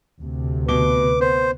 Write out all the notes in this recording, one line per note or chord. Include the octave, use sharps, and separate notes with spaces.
D2 C3
B2 B4 D6 G7
B3 C5